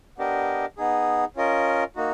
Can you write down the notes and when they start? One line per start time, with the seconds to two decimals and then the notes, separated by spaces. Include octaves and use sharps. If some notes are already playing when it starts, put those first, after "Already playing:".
0.18 B3 D4 G4 A#4 D#5
0.77 B3 D#4 G#4
1.36 C#4 F4 A#4 D#5
1.96 A#3 D#4 F#4